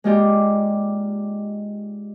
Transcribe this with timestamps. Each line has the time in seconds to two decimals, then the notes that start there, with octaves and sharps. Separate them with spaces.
0.04 G#3 A#3 D#4 F4 G4 D5